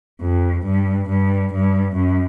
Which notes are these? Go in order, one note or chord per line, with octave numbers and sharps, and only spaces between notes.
F2
G2
G2
G2
F#2